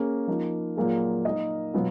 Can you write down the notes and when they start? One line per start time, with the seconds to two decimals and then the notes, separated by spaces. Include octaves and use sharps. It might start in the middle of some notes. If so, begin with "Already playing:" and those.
Already playing: A#3 C#4 G#4
0.28 F3 A#3 D#4
0.76 A#2 F#3 A#3 F4 G#4
1.25 A#3 D#4 A#4 D#5
1.74 B2 F#3 B3 F4